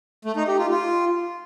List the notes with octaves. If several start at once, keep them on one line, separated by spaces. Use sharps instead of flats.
A3
D#4
G4
F4
F4